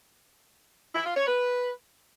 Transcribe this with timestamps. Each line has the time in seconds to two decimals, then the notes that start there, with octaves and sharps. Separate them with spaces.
0.94 E4
1.05 F4
1.16 C#5
1.27 B4